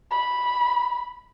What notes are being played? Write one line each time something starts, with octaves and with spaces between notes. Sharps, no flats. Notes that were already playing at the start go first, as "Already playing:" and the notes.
B5